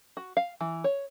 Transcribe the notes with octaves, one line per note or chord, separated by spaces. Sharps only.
F#4
F5
E3
C#5